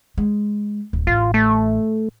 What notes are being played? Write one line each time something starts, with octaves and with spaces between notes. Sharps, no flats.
G#3
D1
A1 F4
A3